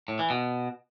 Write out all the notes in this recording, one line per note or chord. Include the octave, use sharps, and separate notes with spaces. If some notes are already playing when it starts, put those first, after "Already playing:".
A2
E3
B2